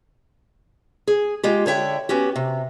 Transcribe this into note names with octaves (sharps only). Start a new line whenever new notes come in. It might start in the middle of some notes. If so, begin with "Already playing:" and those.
G#4
G#3 F4 G4
D3 C#5 E5 G5
B3 C#4 F#4 G4
C3